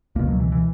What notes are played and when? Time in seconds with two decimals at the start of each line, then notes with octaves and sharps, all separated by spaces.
0.15 C#2 B2 A#3
0.28 F#3
0.40 E3
0.52 E3